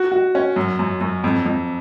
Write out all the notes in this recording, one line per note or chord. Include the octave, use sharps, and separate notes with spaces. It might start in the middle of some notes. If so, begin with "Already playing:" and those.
Already playing: F#4
F#4
C#4
F#2
F#2
F#2
F2
F2